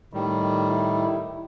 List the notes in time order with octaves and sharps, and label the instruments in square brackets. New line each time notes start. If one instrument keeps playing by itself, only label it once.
[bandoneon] A2 D#3 G3
[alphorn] E4